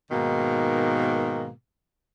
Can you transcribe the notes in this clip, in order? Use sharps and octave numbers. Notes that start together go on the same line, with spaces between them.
G#2 B2 D#3 A#3